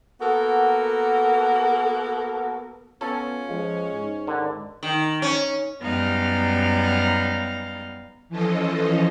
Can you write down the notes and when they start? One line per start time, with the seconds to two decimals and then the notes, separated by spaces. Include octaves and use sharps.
0.21 A#3 B3 F#4 A4 A#4
3.01 B3 C#4 F4 A4
3.50 F3 G#3
3.92 G#2
4.27 D3 D#3
4.83 D#3
5.22 C#4
5.82 F#2 G3 B3 D#4 F5
8.29 E3 F3 C#4 F4 A4 D#5